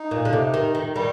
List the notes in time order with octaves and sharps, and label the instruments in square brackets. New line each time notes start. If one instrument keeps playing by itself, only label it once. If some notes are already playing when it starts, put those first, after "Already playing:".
Already playing: [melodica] D#4
[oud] A#2
D3
C3
D#3
D#3
[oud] D#3 [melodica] G3